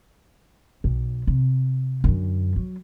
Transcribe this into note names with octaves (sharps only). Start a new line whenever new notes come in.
B1
C3
F#2 D3
F#3